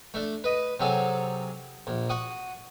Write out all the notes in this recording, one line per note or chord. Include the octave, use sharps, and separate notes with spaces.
A3 D4
B4 D#5
C3 F#3 G#4 A4
A#1
F#4 F#5 D#6